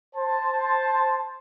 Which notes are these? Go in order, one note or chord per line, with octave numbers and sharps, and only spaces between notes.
C5 A5